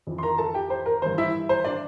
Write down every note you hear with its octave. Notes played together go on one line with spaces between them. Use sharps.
F2 E3
C6
A#4 A#5
A4 A5
G4 G5
C5
A#4
G2 E3 C5
E4 E5
C5
D4 D5